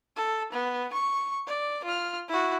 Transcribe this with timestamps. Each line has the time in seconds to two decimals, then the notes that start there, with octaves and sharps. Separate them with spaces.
0.16 A4
0.52 B3
0.93 C#6
1.47 D5
1.84 F4 F6
2.29 E4 F#4